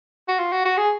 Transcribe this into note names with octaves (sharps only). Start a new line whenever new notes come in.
F#4
F4
F#4
F#4
G#4